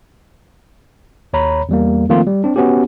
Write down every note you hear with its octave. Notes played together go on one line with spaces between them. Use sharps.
D#2 C#5 A#5 B5
E2 G3 A#3
D#3 F3 A3 A#3 C4 F4
G3
C4 D4
B3 C#4 F#4 G4